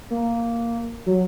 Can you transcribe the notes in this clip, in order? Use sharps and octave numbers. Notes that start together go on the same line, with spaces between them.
A#3
F#3